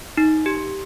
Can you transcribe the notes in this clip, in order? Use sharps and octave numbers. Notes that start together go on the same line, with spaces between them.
D#4
G4